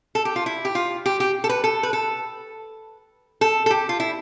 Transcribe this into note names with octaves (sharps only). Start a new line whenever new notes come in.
A4
G4
F4
E4
G4
F4
G4
G4
A4
B4
A4
B4
A4
A4
A4
G4
F4
E4